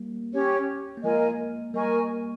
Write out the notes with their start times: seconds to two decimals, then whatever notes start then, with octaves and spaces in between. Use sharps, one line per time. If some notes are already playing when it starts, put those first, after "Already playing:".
Already playing: G3 A#3
0.33 C#4 G4 C#5
0.97 A#3
1.04 F3 G#3 F4 A#4 D#5 G#5
1.74 G3 A#3 A#4 D#5 G#5 C#6